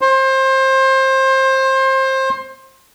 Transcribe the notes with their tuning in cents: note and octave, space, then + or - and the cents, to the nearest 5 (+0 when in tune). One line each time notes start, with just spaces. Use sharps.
C5 +25